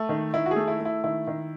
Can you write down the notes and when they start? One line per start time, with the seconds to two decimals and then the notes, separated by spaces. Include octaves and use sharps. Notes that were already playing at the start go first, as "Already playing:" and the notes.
Already playing: A3
0.09 D#3
0.34 D#3 E4
0.46 F#4
0.51 G#4
0.56 A3
0.68 E4
0.80 A3
0.85 E4
1.04 D#3 E4
1.27 D#3